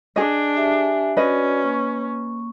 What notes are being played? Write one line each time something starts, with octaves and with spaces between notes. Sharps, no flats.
D4 G#4 D#5
G4 E5 G#5
C#4 F#4 B4 D5 D#5
A#3 C#6